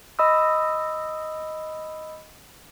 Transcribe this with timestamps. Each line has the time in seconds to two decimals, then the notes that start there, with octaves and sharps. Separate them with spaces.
0.19 D#5 B5 D#6 E6